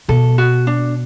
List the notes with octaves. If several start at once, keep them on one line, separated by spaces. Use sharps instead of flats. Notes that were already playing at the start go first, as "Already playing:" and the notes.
B2 A4
F#4
D4